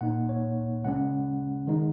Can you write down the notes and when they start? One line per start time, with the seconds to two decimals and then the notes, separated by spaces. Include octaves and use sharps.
0.01 A#2 A#3 D#4 F#5
0.29 C#5
0.84 C#3 G#3 C#4 F#5
1.67 D#3 G#3 D#4